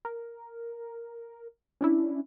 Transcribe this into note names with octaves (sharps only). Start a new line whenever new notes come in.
A#4
C#4 D4 E4